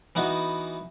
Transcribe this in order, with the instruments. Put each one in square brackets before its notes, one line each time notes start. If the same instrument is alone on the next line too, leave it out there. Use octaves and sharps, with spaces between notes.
[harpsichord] E3 B3 D#4 F#4